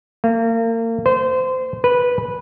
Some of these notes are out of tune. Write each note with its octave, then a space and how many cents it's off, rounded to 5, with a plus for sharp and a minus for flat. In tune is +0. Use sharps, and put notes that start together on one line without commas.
A#3 -35
C5 -25
B4 -10